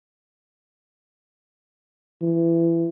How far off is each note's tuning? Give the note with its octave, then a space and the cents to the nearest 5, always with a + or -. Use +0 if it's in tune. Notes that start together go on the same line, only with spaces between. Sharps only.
E3 +25